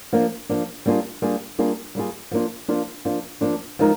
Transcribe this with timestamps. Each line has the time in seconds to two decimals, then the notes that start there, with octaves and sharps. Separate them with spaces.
0.13 F3 A#3 D4
0.49 F3 A#3 D4
0.86 G3 A#3 D4 F4 G#4
1.22 G3 A#3 D4 F4 G#4
1.58 G3 A#3 D4 F4 G#4
1.95 G3 A#3 D4 F4 G#4
2.31 F3 A#3 D4 F4
2.68 F3 A#3 D4 F4
3.05 F3 A#3 D4 F4
3.41 F3 A#3 D4 F4
3.79 F3 G#3 D#4 A#4